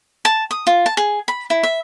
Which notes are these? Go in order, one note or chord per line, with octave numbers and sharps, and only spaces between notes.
A5
D#6
F4
A5
G#4
B5
E4
E5